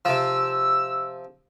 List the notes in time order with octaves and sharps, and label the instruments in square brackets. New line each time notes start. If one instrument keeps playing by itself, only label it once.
[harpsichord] C3 F3 [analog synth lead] E6